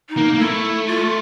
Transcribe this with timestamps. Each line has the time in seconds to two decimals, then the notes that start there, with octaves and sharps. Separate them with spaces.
0.09 D#4
0.17 A#3
0.34 A#3
0.40 A3 E4
0.87 F4